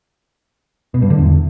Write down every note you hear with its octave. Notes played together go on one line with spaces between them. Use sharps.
B2
G2
D3
E2